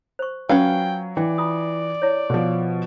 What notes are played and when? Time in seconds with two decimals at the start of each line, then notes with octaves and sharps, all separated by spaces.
0.19 C5 C#6
0.49 F#3 C#4 F4 B4 F5 G5
1.17 E3 D5 G5
1.38 E4 F4 D#6
2.02 E4 C#5
2.30 B2 F3